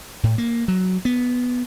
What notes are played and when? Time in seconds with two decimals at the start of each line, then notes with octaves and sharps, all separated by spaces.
0.23 A2
0.38 A#3
0.68 F#3
1.05 B3